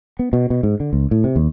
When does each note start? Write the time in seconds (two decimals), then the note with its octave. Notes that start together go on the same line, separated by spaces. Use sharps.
0.19 B3
0.33 B2
0.50 B2
0.63 G#2
0.80 D3
0.93 C#2
1.11 A2
1.24 C3
1.36 D#2